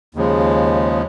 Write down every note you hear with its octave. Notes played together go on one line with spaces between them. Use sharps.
D#2 C#3 F3 G#3